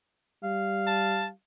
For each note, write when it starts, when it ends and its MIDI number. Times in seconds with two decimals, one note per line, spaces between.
0.43 1.32 55
0.43 1.28 77
0.87 1.27 81